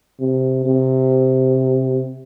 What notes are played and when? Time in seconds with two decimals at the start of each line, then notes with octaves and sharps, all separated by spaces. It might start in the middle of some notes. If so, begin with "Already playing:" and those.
0.20 C3
0.66 C3